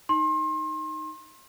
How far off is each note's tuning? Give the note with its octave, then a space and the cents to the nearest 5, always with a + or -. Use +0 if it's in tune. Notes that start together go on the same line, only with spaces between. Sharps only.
D#4 +0 C6 +35